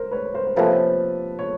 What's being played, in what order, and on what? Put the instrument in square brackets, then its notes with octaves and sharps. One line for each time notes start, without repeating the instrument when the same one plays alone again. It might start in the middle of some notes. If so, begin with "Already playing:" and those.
Already playing: [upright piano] A#4 C5
B4 C#5
A#4 C5
C5
[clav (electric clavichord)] C3 F3 A#3 C#4 [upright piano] A4 B4
[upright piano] C#5